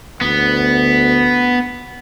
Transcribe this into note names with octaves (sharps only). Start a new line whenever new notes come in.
D2 B3